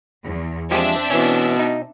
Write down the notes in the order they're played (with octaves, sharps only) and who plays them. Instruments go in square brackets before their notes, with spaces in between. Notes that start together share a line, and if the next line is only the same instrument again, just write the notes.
[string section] E2
[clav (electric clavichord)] F3 G#3 G4 [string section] C4 D4 E5
[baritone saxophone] B2 [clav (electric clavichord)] E3 C#4
[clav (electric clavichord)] D#4